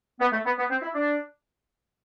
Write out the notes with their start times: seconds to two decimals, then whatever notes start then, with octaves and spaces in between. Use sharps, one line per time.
0.20 B3
0.32 A3
0.45 B3
0.58 B3
0.70 C4
0.82 E4
0.94 D4